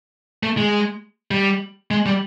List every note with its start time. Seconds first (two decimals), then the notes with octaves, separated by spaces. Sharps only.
0.43 A3
0.58 G#3
1.31 G3
1.91 G#3
2.06 G3